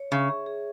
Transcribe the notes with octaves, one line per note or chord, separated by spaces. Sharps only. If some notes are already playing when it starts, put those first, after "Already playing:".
Already playing: C#5
C#3 E5
G#4
G#4